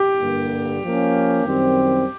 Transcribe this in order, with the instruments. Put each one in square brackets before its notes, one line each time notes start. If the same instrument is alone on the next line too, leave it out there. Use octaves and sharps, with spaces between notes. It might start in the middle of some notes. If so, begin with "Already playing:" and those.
Already playing: [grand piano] G4
[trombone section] G2 D3 G3 A#3
F3 A#3 C#4
F#2 D#3 G3 C4